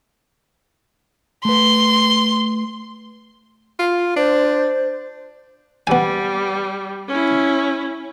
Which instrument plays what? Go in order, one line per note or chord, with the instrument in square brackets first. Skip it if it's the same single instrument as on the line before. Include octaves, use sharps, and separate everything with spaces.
[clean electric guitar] A3 B4 [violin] C6
[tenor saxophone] F4
[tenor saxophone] D4 [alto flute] C5
[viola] G3 [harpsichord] B3 G#5
[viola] C#4 E4